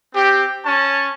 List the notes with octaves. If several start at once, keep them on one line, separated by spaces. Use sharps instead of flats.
C4 G4
C#4 A5 C#6